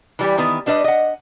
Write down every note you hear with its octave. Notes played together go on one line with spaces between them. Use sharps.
E3 G3 G4
D#3 E3 B3
G3 D4 B4 C#5 D#5
D#5 F#5